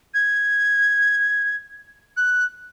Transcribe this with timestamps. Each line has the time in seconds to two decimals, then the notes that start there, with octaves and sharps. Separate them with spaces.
0.14 G#6
2.17 F#6